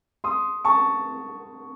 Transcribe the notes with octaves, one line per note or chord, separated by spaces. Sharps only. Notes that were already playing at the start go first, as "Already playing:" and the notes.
C6 D#6
A5 C#6